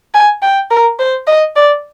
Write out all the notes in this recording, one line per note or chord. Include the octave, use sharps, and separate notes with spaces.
G#5
G5
A#4
C5
D#5
D5